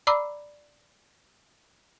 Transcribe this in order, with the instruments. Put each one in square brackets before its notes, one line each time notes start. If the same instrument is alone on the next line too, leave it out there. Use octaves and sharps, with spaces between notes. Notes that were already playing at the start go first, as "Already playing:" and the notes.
[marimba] D5 A#5 B5 D6 E6